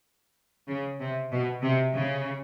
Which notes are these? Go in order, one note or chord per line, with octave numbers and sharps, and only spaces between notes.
C#3
C3
B2
C3
C#3